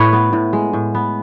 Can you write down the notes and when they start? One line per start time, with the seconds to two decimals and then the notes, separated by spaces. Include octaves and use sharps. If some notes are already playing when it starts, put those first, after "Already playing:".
Already playing: A2 B4 C#5
0.13 B3
0.33 A2
0.53 G#3
0.73 A2
0.95 B3